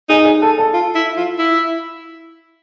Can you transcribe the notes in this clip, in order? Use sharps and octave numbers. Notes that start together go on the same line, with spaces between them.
D#4 G#4
G#4
A4
A4
F4
E4
F4
E4